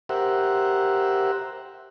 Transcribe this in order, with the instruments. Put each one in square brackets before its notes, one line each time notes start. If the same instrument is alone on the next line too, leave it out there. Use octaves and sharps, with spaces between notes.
[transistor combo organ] G4 A#4 C5 E5 F#5